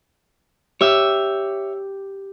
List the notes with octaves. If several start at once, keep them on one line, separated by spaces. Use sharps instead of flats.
G4 C#5 E5